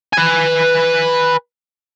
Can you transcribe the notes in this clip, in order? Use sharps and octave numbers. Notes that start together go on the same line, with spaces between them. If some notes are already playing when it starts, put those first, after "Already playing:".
B4 G#5